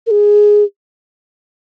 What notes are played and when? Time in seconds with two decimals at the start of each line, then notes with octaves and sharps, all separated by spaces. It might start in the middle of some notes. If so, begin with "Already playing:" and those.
0.07 A#4
0.11 G#4